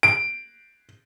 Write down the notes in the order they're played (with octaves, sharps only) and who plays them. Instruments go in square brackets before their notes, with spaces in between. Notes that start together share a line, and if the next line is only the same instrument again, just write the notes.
[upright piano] D7